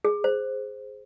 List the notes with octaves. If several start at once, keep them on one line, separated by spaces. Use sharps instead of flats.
G#4
C5